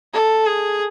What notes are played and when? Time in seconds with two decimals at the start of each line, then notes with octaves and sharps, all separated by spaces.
0.14 A4
0.47 G#4